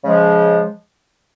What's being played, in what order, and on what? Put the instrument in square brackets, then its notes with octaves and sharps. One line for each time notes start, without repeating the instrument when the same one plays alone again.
[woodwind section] C#3 F3 G#3